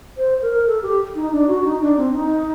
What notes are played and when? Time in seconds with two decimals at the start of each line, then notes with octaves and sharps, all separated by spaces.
0.17 C5
0.42 A#4
0.67 A4
0.82 G4
1.15 D#4
1.32 D4
1.48 F#4
1.64 D#4
1.81 D4
1.97 C4
2.13 D#4